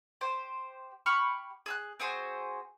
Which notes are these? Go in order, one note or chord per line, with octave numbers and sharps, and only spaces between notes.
G4 C5 C6
G4 B5 C#6 F6
G#4 E6 F#6
C4 F#4 G#4 C5